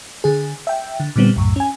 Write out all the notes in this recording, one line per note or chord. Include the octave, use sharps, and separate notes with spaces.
D3 G#4
E5 G5
D3
A#2 D3 G3 B3 C4
C2 F#2 A2
C#4 G#5